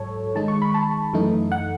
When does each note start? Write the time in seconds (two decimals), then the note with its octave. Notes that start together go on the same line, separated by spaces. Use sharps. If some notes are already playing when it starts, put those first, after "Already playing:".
Already playing: G#2 F#3 A4 C#5
0.35 D#3 G#3 D#4 A5
0.48 C#6
0.62 B5
0.74 A5
1.13 F#2 E3 A3 D#4
1.52 F#5